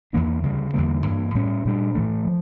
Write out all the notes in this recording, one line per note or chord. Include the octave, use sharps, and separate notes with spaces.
E2 E3 A#3 D4
D2 C#3 G3
E2 D3 G3 A#3
G2 E3 A#3
A2 G3 C#4
A#2 G3 D4
A2 E3 A3
F3